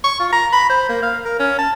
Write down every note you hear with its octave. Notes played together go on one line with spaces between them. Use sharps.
C#6
F4
A#5
B5
C5
A#3
F5
A#4
C#4
A5